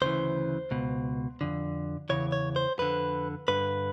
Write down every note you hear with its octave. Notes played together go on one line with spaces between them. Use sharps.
D2 C#3 E3 C5
C#2 B2
F2 D3
E2 C#3 E3 C#5
C#5
C5
F2 D3 B4
G2 D3 B4